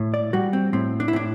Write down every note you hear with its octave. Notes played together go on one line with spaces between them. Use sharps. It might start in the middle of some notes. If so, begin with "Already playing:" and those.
Already playing: A2
D5
G3 F#4
C4
A2 C4
D4
E4
A2 D4